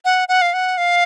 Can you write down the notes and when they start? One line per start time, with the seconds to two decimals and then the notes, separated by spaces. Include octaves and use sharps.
0.05 F#5
0.29 F#5
0.42 F5
0.54 F#5
0.78 F5